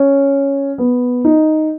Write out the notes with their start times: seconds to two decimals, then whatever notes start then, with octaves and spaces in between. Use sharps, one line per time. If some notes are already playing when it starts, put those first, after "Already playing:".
Already playing: C#4
0.78 B3
1.24 D#4